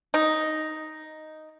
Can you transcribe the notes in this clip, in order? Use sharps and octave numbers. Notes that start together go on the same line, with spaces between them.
D#4